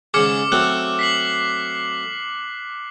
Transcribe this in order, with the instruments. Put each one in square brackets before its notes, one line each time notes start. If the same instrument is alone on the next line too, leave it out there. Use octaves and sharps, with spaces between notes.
[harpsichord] G#2 C#3 G#4 [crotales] D6 F6 C#7
[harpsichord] F#3 A3 C4 [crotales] F#6
[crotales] B6 C7 F#7